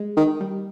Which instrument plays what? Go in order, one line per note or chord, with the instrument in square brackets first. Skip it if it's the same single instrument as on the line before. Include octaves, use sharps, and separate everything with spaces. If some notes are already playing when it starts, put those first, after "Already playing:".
Already playing: [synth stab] G#3
[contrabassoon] D#3
[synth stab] G3